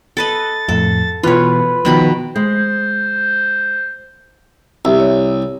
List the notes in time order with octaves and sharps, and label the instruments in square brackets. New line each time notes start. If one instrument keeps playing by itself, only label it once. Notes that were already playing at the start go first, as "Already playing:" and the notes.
[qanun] A4 B4 D#5 [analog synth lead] A6
[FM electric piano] F2 A2 [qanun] A4
[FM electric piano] B2 E3 [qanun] F4 C#5 [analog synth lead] B4
[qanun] B2 D#3 B5 [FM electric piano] F3
[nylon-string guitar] G#3 [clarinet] C5
[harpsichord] C2 [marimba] G4 E5 E6
[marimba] C#5